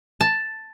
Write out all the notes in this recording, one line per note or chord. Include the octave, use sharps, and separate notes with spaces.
A5